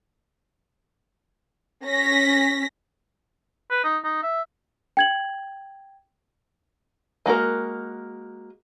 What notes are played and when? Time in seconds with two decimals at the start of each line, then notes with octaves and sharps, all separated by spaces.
1.84 C#4 A#6 B6
3.71 B4
3.84 D#4
4.04 D#4
4.23 E5
4.97 G5 G#6 F#7
7.26 G#3 A#3 F#4 A#4